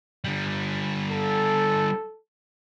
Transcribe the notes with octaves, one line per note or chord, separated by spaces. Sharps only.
D3 G3
A4